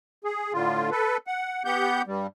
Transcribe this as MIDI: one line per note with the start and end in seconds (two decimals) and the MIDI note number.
0.24 0.53 68
0.53 0.90 45
0.53 0.90 50
0.53 0.90 65
0.91 1.17 69
0.91 1.17 71
1.27 1.63 78
1.65 2.02 59
1.65 2.02 67
1.65 2.02 78
1.65 2.02 91
2.07 2.27 43
2.07 2.27 55